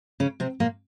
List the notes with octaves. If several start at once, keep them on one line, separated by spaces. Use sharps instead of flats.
C#3 C#4
C3 C4
A#2 A#3